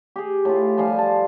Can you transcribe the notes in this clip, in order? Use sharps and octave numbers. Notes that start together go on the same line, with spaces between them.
G4 G#4
A2 F4
F3 G3 F5 G#5
A5